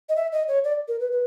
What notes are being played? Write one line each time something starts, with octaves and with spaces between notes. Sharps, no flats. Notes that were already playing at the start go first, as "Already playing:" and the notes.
D#5
E5
D#5
C#5
D5
A#4
B4
B4